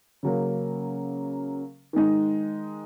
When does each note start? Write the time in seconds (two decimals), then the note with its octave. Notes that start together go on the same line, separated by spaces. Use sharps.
0.23 C#3 F#3 A#3
1.93 D#3 G#3 D#4